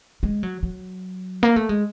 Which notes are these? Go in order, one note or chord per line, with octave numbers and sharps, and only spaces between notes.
G#3
F#3
F#3
A#3
A3
G#3